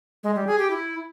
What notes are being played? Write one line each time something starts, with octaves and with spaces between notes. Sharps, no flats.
G#3
G3
G#4
G4
E4